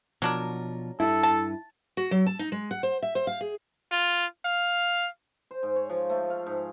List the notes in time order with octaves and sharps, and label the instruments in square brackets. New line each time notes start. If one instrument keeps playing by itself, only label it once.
[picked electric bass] B2 F3 [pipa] F#3 D4 A#4
[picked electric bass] G2 [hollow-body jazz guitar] E4 [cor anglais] A4
[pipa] A5
[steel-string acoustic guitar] F#4
F#3
A5
D#4
G#3
F#5
C5
E5
C5
F5
G#4
[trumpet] F4
F5
[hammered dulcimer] C5
G#2
C#5
F3
A3
F5
G#2